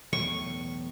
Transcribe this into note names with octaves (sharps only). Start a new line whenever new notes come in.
B1 E2 A2 C#6